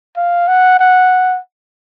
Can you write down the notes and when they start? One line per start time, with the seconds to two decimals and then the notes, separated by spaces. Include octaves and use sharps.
0.17 F5
0.48 F#5
0.80 F#5